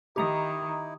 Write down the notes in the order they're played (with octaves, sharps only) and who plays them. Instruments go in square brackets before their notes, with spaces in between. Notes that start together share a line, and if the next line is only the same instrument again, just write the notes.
[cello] D#3 [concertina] D#4 E4 [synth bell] G4 A#5 D#6